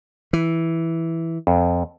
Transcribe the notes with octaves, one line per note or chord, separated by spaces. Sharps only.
E3
F2